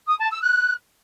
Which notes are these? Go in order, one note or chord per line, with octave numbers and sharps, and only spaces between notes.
D#6
A5
E6
F#6